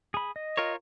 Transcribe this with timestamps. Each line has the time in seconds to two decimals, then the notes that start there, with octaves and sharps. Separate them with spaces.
0.14 G#4 B5
0.36 D#5
0.58 F4 A#4 C#5